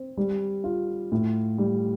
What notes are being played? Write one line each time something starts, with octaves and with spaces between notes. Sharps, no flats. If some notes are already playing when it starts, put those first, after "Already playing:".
Already playing: C4
G3
F4
A2
G3